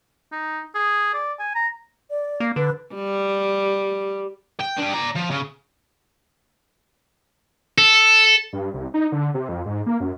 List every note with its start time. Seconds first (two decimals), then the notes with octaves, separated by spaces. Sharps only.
0.32 D#4
0.75 G#4
1.14 D5
1.39 G#5
1.55 A#5
2.10 D5
2.40 A#3
2.56 D3 B4
2.95 G3
4.60 G5
4.78 D4 G4
4.93 D5 A#5
5.15 F3
5.30 C#3
7.78 A4
8.53 G2
8.74 C2
8.94 D#4
9.12 D3
9.34 C3
9.49 F2
9.65 G#2
9.86 A#3
10.00 F#2